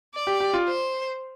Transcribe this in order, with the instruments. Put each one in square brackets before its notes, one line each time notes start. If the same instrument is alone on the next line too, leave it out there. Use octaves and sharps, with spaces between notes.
[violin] D5
[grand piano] G4
G4
F4
[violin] C5